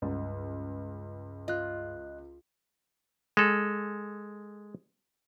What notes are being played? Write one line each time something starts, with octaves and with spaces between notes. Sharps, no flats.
C#2 G2
F4 D#5 F#6
G#3 A4